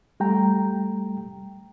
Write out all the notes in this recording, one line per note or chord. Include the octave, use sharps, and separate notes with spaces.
G3 A3 G5 A#5